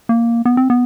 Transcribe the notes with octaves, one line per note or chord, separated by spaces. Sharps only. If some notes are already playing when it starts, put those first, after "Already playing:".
A#3
B3
C4
B3